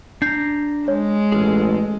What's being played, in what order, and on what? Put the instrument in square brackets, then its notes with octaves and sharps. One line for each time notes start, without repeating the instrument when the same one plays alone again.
[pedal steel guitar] D4 A#5 [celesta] G6 C7
[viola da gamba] G#3 [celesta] C#5
[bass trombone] A1 [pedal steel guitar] G#4 A4 F6